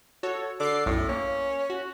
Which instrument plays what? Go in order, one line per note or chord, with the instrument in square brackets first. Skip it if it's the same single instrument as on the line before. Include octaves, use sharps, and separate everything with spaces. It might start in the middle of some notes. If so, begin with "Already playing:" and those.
[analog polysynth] F#4 A4 C#5
[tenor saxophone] D3 [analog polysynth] D6 C7
[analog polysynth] B1 F#2 [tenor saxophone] A2
[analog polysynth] A#3 [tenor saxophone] C#4
[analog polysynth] F#4